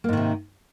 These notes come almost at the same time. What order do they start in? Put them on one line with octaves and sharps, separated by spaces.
A#3 G#2 D#3 C3